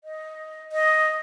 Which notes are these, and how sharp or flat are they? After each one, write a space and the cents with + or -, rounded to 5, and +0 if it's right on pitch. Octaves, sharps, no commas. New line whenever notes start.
D#5 +10
D#5 +5